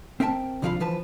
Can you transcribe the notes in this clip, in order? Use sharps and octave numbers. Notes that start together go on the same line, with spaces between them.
C4 A#4 E5 G5 A5
C2 D3 F3 F4 F5 B5
E3 F3 B4 A5